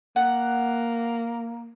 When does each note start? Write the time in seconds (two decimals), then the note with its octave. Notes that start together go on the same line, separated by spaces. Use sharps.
0.16 A#3 F#5